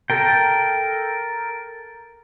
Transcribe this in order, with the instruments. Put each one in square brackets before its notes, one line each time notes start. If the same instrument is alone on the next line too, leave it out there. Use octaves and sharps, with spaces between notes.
[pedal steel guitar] A4 A#4 G5